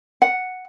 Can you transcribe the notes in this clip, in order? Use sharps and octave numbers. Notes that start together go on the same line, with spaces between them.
F#5